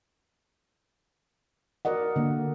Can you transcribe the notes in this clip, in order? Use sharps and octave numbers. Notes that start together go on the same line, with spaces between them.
F#4 A#4 D5 D#5 F#5
D3 A#3